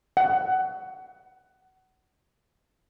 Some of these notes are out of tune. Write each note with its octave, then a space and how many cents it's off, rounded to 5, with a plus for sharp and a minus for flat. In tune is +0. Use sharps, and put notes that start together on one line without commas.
F#5 +20